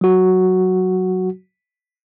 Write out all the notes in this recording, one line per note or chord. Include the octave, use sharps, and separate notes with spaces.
F#3 F#4